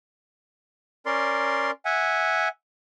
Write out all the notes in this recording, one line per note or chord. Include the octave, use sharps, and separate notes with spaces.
C#4 A#4 D5 C6
E5 F#5 G#5